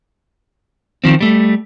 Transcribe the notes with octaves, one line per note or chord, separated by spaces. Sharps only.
D#3 F3 C4
G3 A3